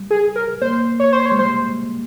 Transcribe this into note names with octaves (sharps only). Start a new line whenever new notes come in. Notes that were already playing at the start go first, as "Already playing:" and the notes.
Already playing: G3
G#4
A#4
A#3 C5
C#5
C5
C#5
G#3
G3 C5